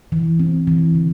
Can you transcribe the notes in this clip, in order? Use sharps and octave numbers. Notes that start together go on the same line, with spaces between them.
E3
C4
E3
D3